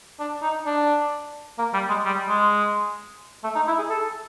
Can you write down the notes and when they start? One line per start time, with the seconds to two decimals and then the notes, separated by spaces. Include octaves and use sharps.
0.19 D4
0.42 D#4
0.66 D4
1.58 A#3
1.74 G3
1.89 G#3
2.05 G3
2.28 G#3
3.44 A3
3.55 D#4
3.67 E4
3.79 G#4
3.89 A4